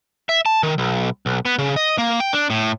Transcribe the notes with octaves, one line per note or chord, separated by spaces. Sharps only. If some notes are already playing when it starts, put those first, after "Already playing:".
E5
A5
D#3
B1
B1
B3
C#3
D#5
A#3
G5
D4
A2